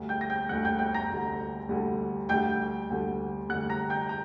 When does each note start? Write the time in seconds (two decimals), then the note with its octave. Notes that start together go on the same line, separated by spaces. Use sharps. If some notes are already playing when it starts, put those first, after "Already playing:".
Already playing: D2 D3 G3
0.09 G5 G6
0.21 A#6
0.30 G5 G6
0.49 D2 D3 G3 F#5 F#6
0.65 G5 G6
0.79 G5 G6
0.95 A#5 A#6
1.09 D2 D3 G3
1.69 D2 D3 G3
2.29 D2 D3 G3 G5 G6
2.90 D2 D3 G3
3.49 D2 D3 G3 F#5 F#6
3.70 A#5 A#6
3.90 G5 G6
4.09 A#5